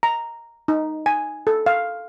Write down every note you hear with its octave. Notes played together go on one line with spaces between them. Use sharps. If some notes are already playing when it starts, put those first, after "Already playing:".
A#5
D#4
G#5
A4
F5